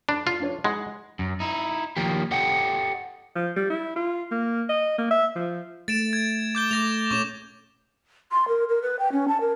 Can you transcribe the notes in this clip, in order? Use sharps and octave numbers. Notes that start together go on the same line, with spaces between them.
D4 B5
F4 F5
D4 C#5
G#3 F#5 B5 C6
F#2
D#4 E4
D#3 F3 A#3 G4
G4 A4 D#5 F#5 G5
F3
G3
E4
F4
A#3
D#5
A#3
E5
F3
A3 A6 D7 E7
G#6
D6 G6 G7
A3 D6 A#6 F7
A#2 C#4 A4 C#6 D6 E7
C6
A#4
A#4
B4
G5
C#4
A5
A#4